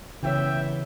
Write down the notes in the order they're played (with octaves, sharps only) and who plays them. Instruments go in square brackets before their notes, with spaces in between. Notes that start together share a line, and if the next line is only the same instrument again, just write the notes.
[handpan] C#3 B4 C#5 [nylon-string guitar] E3 A3 B3 [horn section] E5 G5